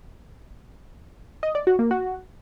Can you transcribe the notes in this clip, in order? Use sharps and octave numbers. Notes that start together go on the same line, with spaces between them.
D#5
D5
F#4
A#3
F#4